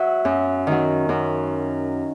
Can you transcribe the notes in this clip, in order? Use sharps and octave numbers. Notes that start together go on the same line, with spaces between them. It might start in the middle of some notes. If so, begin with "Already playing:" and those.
Already playing: F#3 E5 F#5
F#2
D#3 F#3
F#2